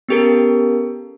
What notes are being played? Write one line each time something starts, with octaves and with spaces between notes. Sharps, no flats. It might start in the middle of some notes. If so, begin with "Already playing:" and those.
B3 C#4 G4 A4 A#4